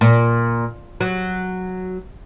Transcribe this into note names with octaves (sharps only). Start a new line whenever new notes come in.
A#2
F#3